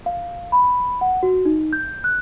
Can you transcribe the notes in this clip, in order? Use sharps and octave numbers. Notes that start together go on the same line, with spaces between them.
F5
B5
F#5
F#4
D#4
G6
F#6